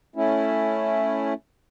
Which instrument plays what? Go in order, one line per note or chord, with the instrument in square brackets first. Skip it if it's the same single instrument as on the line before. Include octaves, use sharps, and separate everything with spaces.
[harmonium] A3 C#4 E4